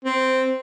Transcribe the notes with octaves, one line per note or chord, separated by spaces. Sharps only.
C4